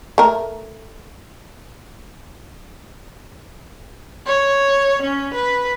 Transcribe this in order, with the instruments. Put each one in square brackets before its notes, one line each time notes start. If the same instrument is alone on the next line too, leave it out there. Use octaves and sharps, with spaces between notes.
[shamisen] A3 A#4
[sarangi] C#5
C#4
B4